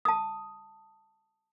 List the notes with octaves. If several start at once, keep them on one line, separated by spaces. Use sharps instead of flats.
A5 D#6